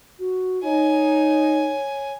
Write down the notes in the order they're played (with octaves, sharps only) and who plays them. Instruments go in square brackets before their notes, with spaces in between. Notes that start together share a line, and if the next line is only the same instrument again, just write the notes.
[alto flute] F#4
[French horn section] D#4 [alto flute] C#5 [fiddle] G#5